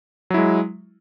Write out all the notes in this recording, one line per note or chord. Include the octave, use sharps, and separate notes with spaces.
F#3 G#3 E4